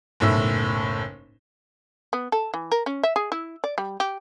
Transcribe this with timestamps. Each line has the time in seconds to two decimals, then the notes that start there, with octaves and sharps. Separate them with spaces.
0.20 F#1 B1 A2 E5 E6
2.13 B3
2.32 A4
2.54 E3
2.72 A#4
2.86 C#4
3.03 E5
3.16 G#4
3.32 E4
3.64 D5
3.78 G3
4.00 G4